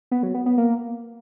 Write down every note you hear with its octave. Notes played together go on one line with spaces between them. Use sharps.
B3
F#3
B3
B3
A#3